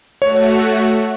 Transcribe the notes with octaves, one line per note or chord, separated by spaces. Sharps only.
A3 F#4 C#5